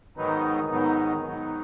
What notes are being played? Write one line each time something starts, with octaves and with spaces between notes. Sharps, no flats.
G#2 D#3 F#3 B3 D#4
G#2 D#3 F#3 B3 D#4
G#2 D#3 F#3 B3 D#4